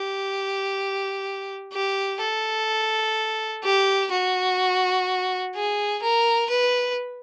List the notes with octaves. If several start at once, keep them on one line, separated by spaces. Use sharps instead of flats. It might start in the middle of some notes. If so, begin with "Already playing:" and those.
Already playing: G4
G4
A4
G4
F#4
G#4
A#4
B4